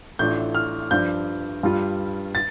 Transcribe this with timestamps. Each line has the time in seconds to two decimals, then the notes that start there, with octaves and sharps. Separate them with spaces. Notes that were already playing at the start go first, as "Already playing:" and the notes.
0.19 A1 A2 A3 D4 F4 G6
0.55 F6
0.91 G2 F3 D4 G6
1.63 G2 G3 F4
2.35 A6